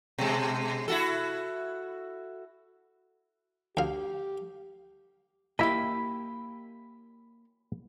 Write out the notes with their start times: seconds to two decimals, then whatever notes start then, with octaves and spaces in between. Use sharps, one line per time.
0.18 B2 G#3
0.88 E4 F#4 A4
3.77 D2 G4 F5
5.59 A#3 E4 G4 D#5 B5